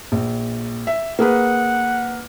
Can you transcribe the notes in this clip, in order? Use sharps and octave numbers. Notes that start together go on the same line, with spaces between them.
A#1
E5
A#3 G#4 B4 F#5